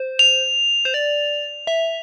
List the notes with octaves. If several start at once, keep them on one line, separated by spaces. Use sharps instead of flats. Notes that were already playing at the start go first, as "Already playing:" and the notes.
Already playing: C5
F7
C5
D5
E5